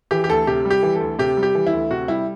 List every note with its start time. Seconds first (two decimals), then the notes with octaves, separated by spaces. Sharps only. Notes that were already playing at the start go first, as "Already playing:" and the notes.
0.11 E3 G4
0.24 G4
0.29 D2 A4
0.47 C3 G4
0.65 G3
0.70 G4
0.83 E3
0.95 A4
1.01 D2
1.19 C3 G4
1.37 G3
1.43 G4
1.55 E3
1.67 E4
1.73 D2
1.91 C3 F#4
2.08 G3 E4